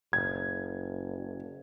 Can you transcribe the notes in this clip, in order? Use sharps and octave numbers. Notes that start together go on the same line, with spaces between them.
F#1 G#6